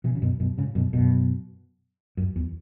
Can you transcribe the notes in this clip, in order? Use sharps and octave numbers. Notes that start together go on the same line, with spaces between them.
B2 E3
C#3
F#2 B2
F#2 B2
G#2 C#3
F#2 B2
F#2 B2
F#2
E2